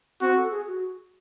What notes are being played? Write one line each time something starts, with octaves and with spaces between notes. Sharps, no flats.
C4 F#4
A4
G#4
F#4